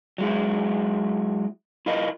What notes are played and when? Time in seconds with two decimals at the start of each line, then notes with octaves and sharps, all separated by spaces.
0.18 F#3 G#3 E4
1.86 E4 F4 A#4 D#5